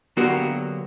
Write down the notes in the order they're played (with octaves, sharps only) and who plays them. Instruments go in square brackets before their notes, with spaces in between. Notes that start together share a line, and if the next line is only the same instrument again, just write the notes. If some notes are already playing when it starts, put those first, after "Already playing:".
[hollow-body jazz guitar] D3 F#3 A#3 B3 F#4 G4